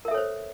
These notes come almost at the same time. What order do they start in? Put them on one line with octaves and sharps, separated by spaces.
A#4 E5 A4 C#5 C5